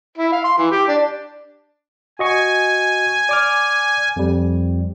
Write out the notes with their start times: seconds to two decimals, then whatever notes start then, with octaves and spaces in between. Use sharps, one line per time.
0.18 E4
0.32 F5
0.45 C6
0.58 E3
0.71 G4
0.88 D4
2.19 F#4 D#5 G#5 C#6
3.29 D5 D6 F6
4.16 F2 G3